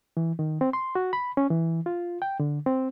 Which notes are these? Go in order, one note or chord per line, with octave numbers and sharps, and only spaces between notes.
E3
D#3
C4
C6
F#4
B5
C#4
E3
F4
G5
D3
C4